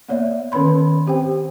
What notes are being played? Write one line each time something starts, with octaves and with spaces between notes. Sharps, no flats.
A#3 B3 C#5 D5 E5
D#3 C#4 B4 C#5 B5 C6
C4 G4 C5 G5